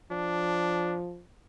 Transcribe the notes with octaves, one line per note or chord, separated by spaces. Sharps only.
F3 D4